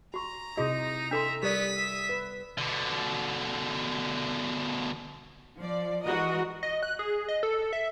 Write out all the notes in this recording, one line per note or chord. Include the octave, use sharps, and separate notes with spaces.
F#4 A#5 C#6
C3 D#4 E4 F#4 G#4 D#5
D4 A4 E5 C6
G3 B3 G4 A#4 D5 D#6 B6
E5
B4
B2 D3
F3 D5
E3 G#3 F#4 A#4 D#5
D#5
F#6
G#4
D#5
A4
E5